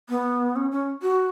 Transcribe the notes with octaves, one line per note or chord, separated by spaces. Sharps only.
B3
C#4
C#4
F#4